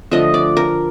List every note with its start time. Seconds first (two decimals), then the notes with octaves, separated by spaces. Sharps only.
0.11 D3 F3 A3 D#5
0.34 D5
0.57 A#4